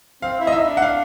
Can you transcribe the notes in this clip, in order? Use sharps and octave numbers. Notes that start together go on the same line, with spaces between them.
C4 F5
E4
D#5
D#4 E5
D4
F#5
F5